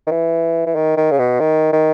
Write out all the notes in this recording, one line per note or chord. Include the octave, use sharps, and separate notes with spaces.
D#3
E3
E3
D#3
D#3
C#3
B2
D#3
D#3